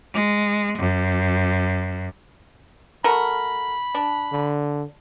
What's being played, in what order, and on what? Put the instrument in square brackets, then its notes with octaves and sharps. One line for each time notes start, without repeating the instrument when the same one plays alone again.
[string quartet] G#3
F#2
[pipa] A3 F#4 A#4 [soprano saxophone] B5
[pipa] D4
[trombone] D3